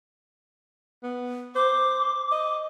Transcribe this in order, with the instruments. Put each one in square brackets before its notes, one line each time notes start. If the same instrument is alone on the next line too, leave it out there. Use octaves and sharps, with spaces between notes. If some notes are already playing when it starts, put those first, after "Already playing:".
[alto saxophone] B3
[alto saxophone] C5 [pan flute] D6
[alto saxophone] D#5